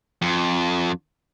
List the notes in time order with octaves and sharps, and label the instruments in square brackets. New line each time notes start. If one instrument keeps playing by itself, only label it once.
[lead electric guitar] F2